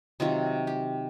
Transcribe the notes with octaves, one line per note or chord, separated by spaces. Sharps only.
C3 D#3 F#3 F4
G4